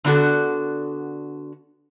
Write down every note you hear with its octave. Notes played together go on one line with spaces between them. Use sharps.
D3 B3 D4 F#4 A4